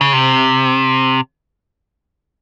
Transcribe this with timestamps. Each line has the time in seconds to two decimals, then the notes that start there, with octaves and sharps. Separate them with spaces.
0.01 C#3
0.13 C3